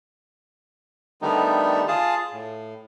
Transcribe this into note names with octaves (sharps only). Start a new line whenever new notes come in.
D3 D#3 G3 A3 B3 D#4
F4 G#4 A5
A2